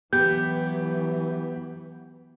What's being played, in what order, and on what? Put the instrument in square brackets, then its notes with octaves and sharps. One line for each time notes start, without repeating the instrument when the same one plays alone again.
[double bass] E3 F#3 [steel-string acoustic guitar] B3 [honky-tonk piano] G4 [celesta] G6